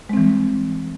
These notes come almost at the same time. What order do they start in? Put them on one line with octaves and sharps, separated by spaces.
G#3 C4 E3 G3